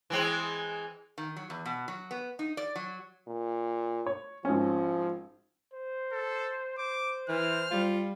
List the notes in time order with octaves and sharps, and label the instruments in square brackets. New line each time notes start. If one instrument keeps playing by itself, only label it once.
[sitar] E3 G#3 C4
[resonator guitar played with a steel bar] D#3
F#3
E2
B2
F#3
B3
D#4
D5
F#3
[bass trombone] A#2
[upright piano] C#5
[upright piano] G#1 C#4 [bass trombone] F3
[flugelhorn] C5
[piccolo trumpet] A4
[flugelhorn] C5 [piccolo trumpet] D6
[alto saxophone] E3 [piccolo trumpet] F6
[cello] G3 [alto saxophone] F4